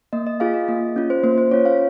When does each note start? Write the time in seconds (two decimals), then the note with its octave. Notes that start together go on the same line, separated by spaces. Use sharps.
0.13 A#3 D#5
0.27 D#5
0.40 F4 G#4 F5
0.54 D#5
0.68 A#3 D#5
0.96 C#4 F4
1.10 C5
1.23 A#3 C5
1.38 C5
1.51 C#4 F4 C#5
1.65 F5